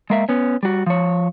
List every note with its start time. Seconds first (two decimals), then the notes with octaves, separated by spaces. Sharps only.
0.10 G#3 A#3 E5
0.29 B3 C#4
0.63 G3 F#4
0.86 F3 C#5